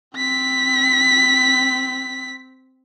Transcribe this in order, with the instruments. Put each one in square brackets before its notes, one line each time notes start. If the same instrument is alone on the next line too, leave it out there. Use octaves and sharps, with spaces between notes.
[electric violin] C4 B6